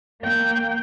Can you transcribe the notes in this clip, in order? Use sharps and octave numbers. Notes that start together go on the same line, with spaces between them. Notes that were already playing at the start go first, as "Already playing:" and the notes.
A#3 G5